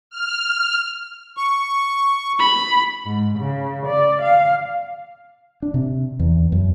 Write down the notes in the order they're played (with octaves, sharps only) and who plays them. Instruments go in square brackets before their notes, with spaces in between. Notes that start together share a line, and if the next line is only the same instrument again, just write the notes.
[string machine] F6
[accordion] C#6
[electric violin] B5
[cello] G#2
C#3
D5
F5
[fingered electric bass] D4
C3
E2
F#2